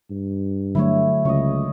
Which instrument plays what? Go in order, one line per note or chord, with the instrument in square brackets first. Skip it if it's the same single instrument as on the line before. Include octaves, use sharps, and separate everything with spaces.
[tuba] G2
[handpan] D3 F#3 A3 [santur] E4 C#5
[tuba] C#2 [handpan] C#3 [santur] C#5 D#5